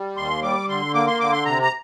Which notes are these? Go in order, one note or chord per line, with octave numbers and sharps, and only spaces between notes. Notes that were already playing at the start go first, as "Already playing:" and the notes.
Already playing: G3
D#2 C6
G3 D6
D3 C6
A#3 D6
C6
D3 D6
C6
C3 A#5
A#5